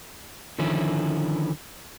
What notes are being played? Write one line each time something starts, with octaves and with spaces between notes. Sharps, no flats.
D3 D#3 F3 C#4 E4